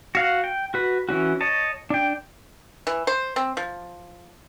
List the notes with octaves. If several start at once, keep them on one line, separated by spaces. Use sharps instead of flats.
F#4 F5 F#5
G5
F#4 B4
E3 C#4 F#4
C#5 D#5 A5
D4 G5
E3
C5
C4
F3